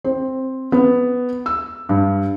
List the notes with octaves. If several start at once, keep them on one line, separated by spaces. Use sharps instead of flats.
C4
B3
E6
G2